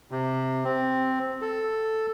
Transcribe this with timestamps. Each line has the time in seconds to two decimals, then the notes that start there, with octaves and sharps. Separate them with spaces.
0.11 C3
0.64 C4
1.41 A4